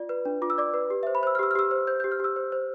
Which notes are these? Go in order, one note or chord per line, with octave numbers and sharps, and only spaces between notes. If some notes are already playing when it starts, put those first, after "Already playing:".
Already playing: F4 D5
B4
D4
F4 D6
E6
D5 D6
B4
G4
C5 E5
B5
C5 E6
F6
G4 E6
F6
G4 E6
C5
C5 G6
G4 G6
F6
G4 E6
C5
C5